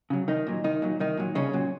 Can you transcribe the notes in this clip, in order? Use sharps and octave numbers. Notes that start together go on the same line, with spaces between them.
C#3 F#3
C2 D#3 D#4
A#2 F#3
C2 D#3 D#4
A#2 F#3
C2 D#3 D#4
A#2 F#3
C2 C#3 C#4
A#2 F#3